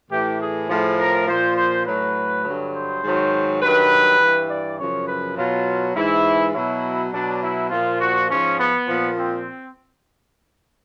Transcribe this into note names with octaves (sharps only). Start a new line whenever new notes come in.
A2 E3 G4
G#4
A2 F3
A#4
A#2 F3 C5
C5
A2 F#3 B4
G2 D3 F#3
C5
G#2 D#3 F#3
G2 D#3 F#3 B4
G2 E3
D5
F#2 C#3 F3 C#5
B4
B2 F#3 F4
G#2 E3 E4
B2 F#3 E4
B2 F#3 D4
E4
A#2 F3 F4
F#4
G#2 F3 C#4
B3
A#2 F3
C4